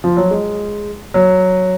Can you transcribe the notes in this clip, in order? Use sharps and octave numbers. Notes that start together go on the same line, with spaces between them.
F3
F#3
G#3
F#3